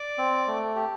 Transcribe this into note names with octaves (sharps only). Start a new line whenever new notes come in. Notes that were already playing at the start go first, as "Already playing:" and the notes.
Already playing: D5 D6
C4
A3
G4